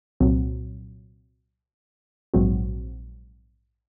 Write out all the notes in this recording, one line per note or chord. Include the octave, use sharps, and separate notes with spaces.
C2 A#2 F#3 C4
A#1 G#2 F#3 C4 F#4